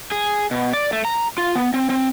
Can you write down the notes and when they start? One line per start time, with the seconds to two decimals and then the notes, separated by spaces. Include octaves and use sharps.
0.11 G#4
0.51 B2
0.73 D5
0.93 A3
1.05 A#5
1.38 F4
1.55 B3
1.74 C4
1.90 C4